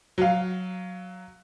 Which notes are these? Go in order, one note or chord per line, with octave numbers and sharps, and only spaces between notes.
F#3 F5